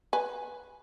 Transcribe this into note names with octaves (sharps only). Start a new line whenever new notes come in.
B4 G#5